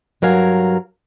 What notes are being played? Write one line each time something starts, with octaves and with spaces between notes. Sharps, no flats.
G2 F#3 A#4 F5 G#5